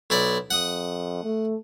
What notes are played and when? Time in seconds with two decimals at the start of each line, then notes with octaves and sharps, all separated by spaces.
0.10 B1 E4 D5
0.51 F2 F#5 D#6
1.23 A3